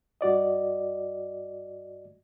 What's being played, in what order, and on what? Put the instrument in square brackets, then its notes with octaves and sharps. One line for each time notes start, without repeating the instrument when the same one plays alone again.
[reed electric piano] G2 F#4 D5 D#5